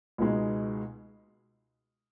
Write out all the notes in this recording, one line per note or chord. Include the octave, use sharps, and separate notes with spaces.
C#2 B2 G#3 D#4